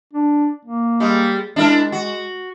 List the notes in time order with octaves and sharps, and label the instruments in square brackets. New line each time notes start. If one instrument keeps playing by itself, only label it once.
[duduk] D4
A#3
[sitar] G3 G#3
[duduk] G#3 [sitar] D4 E4 A#4
[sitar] F#4